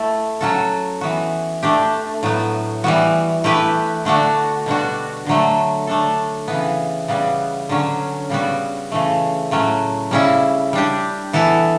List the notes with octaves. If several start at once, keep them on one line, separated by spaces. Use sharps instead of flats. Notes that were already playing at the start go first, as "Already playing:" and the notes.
Already playing: A3 E4 A4
F#3 C#4 F#4 A4
E3 B3 F#4
A3 D4 G4
A2 F#3 B3
E3 G3 B3 F#4
A3 E4 G4 B4
D3 A3 D4 F#4
B2 G3 D4 F#4
D3 F#3 A3
A3 D4 A4
C#3 E3 B3
C#3 G3 B3
D3 F#3 C#4
C#3 G3 B3 F#4
C#3 E3 A3
A2 F#3 A3 C#4
C#3 G3 C#4 E4
G3 D4 G4
E3 B3 E4 A4